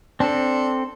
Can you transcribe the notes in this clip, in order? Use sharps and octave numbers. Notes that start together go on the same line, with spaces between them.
C4 D4 A4